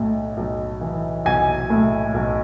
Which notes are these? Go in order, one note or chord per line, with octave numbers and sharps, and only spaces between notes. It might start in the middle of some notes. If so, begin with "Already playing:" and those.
Already playing: B1 A2
B1
E3
B1 G#5
A2
B1